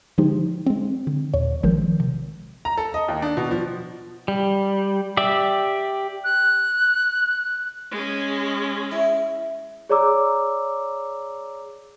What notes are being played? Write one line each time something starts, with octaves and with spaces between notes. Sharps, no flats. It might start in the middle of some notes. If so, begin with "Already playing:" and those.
D3 F3 G#3 D#4 G4 C5
G#3 C4
D3
D#2 A#2 C#5
A1 D#3 F3 G#3 A#4 G6
C3
A#5
A4
D#5
D#2
D4
B2
F3
G3
G4 D5 E5
F#6
G#3 C#4
E4
G#4 C#5 D5 A#5 D6 E6